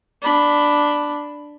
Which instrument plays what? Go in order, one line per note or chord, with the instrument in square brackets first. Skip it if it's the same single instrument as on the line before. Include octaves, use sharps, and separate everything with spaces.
[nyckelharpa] D4 B5